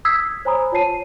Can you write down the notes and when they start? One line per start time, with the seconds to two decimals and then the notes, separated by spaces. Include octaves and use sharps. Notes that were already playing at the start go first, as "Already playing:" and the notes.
0.05 D#6 E6 G#6 B6 C7
0.45 C5 C#5 G#5 A#5 B5 D#6
0.72 F4 C#5 A5 C7 D#7